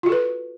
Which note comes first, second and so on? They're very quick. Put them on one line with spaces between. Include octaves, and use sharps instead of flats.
F4 F#4 A4 B4